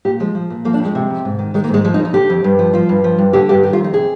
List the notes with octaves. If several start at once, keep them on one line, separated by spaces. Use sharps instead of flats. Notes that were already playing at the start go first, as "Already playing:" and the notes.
A#2 G4
F3 G#3
F3
A#2
F3 A#3
D4
F2
G#3
C3
F2
G#2
D#3
D#3 G#3
A#3
G#2
G#3
F3 G#3
D#4
F2
D#4
D3 G4
F2
G2
F3
F3 F4
G2
F3
G2
D3 G4
G2 G4
D#3 G4
F4
F2
D#4
C3 G#4